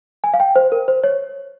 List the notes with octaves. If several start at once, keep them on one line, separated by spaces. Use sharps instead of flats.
G#5
F5
G5
C5
A#4
C5
C#5